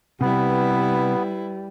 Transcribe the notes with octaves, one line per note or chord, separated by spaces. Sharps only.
C3 G3 B3 E4 B4